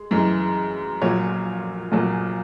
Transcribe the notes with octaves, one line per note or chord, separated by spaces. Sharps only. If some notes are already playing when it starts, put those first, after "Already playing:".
Already playing: G#3
F#2 E3 G#3
A#1 A#2 F#3 C#5
A#1 A#2 F#3